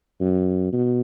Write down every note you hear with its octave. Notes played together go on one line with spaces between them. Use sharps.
F#2
B2